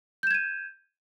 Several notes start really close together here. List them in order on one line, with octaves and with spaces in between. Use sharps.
G6 E7 G#6 D#7